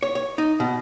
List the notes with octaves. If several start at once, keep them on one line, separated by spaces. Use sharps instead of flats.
C#5
C#5
D#4
B2